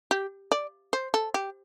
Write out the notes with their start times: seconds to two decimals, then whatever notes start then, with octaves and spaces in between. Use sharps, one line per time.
0.11 G4
0.52 D5
0.93 C5
1.14 A4
1.34 G4